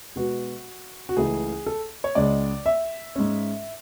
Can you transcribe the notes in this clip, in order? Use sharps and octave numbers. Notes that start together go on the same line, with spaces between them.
B2 G#3 B3 F#4
F#4
C#2 C#3 E3 A3 G#4
A4
C#5
C#2 C#3 G#3 D5
E5
G#2 G#3 C#4